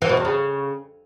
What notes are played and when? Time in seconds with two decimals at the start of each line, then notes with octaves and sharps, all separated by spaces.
0.02 E3
0.09 B2
0.17 E2
0.25 C#3